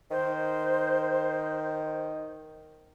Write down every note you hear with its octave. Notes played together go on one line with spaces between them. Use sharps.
D#3 C5